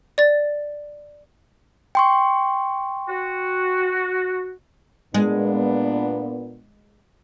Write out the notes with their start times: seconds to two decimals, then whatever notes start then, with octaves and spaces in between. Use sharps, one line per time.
0.18 D5 A6
1.95 G5 C6 C#6
3.08 F#4
5.14 A#2 G#3 B3 D4